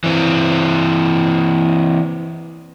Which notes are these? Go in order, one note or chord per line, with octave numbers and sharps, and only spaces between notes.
E3 C4